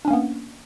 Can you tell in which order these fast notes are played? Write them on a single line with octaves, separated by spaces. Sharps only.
D4 C#4 A#3 B3